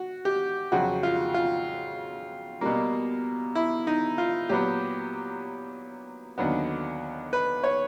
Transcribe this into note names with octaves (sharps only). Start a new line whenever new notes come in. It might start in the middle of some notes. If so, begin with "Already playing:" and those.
Already playing: F#4
G4
F2 C#3 F#3 F#4
F4
F4
B2 G3 A#3
E4
D#4
F4
A#2 F#3 B3 G4
D#2 D3 F#3 B3
B4
C#5